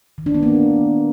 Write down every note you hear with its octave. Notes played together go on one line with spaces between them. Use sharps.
D#3
D4
B3
A#3